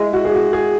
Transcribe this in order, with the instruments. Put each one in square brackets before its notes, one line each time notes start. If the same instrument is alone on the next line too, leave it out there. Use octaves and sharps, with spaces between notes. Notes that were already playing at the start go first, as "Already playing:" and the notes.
Already playing: [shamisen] G#3 [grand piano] E4
[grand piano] F#4
G#4
F#4
G#4